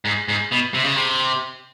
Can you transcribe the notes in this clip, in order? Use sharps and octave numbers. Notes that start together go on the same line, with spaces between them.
G#2
G#2
B2
C3
C#3
C3